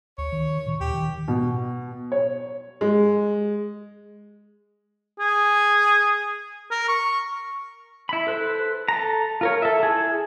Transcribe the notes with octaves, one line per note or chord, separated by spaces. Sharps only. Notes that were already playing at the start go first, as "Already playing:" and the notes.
D2 C#5
D#3
A#2
D#2 G4
D#3
B2
C#5
G#3
G#4
A#4
C#6
E4 B5
A4 B4 C5
A4 A#5
F4 A#4 C#5
A4 E5
E4 G#4